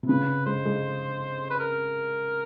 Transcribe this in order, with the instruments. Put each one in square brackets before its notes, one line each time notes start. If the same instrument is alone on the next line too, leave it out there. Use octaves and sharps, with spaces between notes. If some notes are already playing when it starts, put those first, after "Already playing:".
[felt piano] C3
[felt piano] C#3 [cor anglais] B4
[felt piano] G#3 [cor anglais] C5
[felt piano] G#3
[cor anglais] B4
A#4